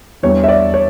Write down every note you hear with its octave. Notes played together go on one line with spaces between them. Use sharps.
E2 E3 G3 D4 C#5
E5
D5
C#5